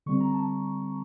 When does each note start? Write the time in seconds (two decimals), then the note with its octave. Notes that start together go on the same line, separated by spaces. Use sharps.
0.06 D3 G3 C4 C#6
0.20 A#5
0.34 A5
0.48 A5